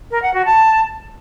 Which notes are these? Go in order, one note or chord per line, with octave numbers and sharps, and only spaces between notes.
A#4
F#5
F#4
A5